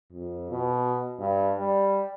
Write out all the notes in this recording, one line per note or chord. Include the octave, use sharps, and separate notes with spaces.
F2
B2
G2
G3